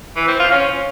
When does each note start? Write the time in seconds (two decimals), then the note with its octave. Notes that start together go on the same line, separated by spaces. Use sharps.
0.16 E3
0.28 C4
0.39 F4
0.51 C#4